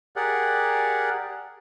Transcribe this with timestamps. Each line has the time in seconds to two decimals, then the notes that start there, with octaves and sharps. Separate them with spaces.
0.16 G4 G#4 A#4 D5 F#5